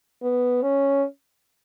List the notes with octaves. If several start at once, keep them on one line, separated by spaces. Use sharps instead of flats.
B3
C#4